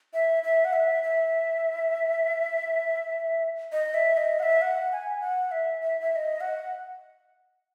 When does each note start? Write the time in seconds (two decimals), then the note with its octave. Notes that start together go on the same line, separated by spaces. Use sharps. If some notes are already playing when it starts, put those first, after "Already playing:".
0.14 E5
0.44 E5
0.65 F#5
0.73 E5
1.03 E5
3.72 D#5
3.94 E5
4.17 D#5
4.39 F#5
4.43 E5
4.62 F#5
4.92 G#5
5.21 F#5
5.51 E5
5.82 E5
6.01 E5
6.12 E5
6.16 D#5
6.41 F#5